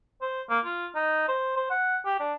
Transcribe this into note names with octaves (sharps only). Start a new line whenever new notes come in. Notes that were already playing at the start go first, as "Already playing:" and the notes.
C5
A#3
F4
D#4
C5
C5
F#5
G4
D4